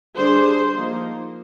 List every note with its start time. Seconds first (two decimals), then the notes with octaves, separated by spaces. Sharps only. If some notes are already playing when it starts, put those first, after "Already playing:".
0.17 D3 G3 D4 G#4 C5
0.76 F3 A#3 D#4